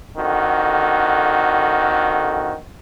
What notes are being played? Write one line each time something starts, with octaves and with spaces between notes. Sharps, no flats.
F2 D3 D#3 F#4